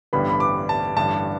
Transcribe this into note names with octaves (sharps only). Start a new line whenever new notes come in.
A1 G2 D3 G3 B3 B5
B5
D6
A5
A1 G2 D3 A5